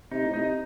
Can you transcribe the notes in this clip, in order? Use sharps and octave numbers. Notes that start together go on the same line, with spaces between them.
C3 D#4
A2
C3 D#4